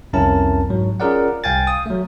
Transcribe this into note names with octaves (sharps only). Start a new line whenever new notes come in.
C2 F2 C#4 E4 A#4 A5
G#2 F#3
C#4 F4 G#4 A#4 D5 F#5
C2 F5 G5 G#5 A6
D#6
F#3 A3